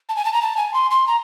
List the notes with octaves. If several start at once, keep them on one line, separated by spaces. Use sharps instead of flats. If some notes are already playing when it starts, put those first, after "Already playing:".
A5
G#5
A5
A#5
A5
G#5
C6
C6
A#5